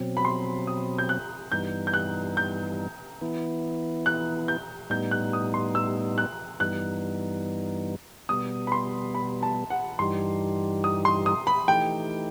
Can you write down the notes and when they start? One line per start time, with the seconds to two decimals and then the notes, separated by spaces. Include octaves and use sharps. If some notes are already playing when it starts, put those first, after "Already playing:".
Already playing: B2 F#3 C4
0.17 B5
0.25 C6
0.67 D#6
0.98 G6
1.09 F#6
1.52 G2 E3 G3 B3 D#4 G6
1.87 G6
1.94 F#6
2.37 G6
3.21 E3 B3 E4
4.06 F#6
4.48 G6
4.90 A2 G3 B3 D#4 G6
5.11 F#6
5.33 D#6
5.54 C6
5.75 E6
6.18 F#6
6.60 G2 E3 G3 B3 D#4 F#6
8.29 B2 G3 B3 D#6
8.67 B5
8.72 C6
9.14 B5
9.43 A5
9.70 F#5
9.99 G2 E3 G3 D#4 G4 C6
10.84 D#6
11.05 C6
11.26 D#6
11.47 B5
11.68 E3 A3 D#4 G4 G5